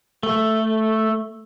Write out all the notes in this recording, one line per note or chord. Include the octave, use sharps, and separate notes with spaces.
A3